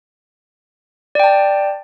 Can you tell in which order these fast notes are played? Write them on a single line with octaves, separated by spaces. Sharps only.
D5 G5 A5